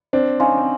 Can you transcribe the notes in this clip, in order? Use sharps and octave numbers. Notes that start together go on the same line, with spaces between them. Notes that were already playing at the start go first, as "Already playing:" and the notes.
C4 D4 C5
C#4 D#4 F5 G#5 C6
C4